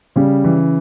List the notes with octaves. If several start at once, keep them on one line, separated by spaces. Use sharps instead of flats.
C#3 G3
E3